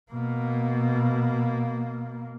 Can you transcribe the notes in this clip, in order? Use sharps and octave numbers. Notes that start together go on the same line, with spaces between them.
B2 A#3